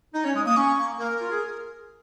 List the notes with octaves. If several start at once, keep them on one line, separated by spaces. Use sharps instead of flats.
D#4 D#5
C#4 C#5
G#3 D#6
A#3 D#6
C#4 C#6
A#3
A#3 A#4
F4
G#4